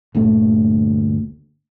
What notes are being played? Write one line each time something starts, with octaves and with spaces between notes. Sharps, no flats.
G1 D2 A#2 A3